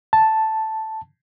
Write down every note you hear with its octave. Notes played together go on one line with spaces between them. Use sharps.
A5